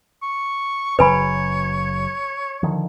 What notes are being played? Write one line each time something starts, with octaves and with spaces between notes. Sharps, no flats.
C#6
F#1 C#3 F#3 B4 C#5 G#5 B5
D3 D#3 F3